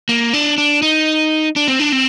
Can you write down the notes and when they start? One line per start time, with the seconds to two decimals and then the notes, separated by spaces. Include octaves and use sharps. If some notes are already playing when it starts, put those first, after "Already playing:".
0.09 A#3
0.33 D4
0.58 D4
0.82 D#4
1.56 D4
1.68 C4
1.80 D4
1.92 C4